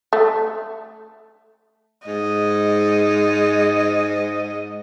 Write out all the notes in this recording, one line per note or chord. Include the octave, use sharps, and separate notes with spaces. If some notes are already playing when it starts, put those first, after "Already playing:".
A3
G#2 D#5